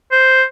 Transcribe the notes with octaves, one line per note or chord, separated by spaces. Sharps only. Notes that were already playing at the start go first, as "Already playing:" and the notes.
C5